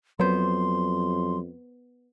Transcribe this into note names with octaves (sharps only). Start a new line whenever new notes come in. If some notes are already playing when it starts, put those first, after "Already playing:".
F2 F#3 B3 C5 C6